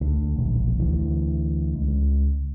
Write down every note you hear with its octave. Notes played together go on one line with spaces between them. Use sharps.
D2
E1 A#1
D2 E3
C#2